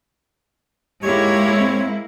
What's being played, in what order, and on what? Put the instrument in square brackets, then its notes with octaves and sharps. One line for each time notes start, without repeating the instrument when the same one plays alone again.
[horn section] G#2 C#5 [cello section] G#3 A#3 E4 [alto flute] G4
[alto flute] C4